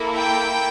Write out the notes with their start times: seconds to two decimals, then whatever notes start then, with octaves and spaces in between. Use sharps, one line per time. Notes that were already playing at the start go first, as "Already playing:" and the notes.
Already playing: A#3 E4 A4
0.17 G5